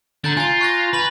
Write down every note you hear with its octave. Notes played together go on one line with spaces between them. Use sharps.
D3 A#5 G6 A6
F4 G#5 A6
C#6 F#6 A#6
B4 B5 F#7